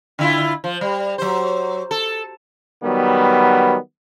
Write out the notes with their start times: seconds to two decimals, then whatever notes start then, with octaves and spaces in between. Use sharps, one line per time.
0.19 D3 E4 F4
0.64 F3
0.81 G3
1.18 F#3 C5
1.91 A4
2.84 D#3 F#3 G3 B3